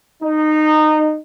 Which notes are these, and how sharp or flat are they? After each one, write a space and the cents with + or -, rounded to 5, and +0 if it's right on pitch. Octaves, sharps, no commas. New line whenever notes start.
D#4 -20